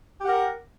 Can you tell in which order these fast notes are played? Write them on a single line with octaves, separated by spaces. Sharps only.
G4 F#5 A#4